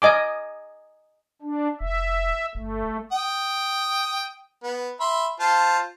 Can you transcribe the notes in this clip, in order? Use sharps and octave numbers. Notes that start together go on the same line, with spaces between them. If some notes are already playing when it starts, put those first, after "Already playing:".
D#5 G#5 D6
D4
F1 E5
G1 A3
G5 D#6
B3
E5 B5 C6
F4 C5 A5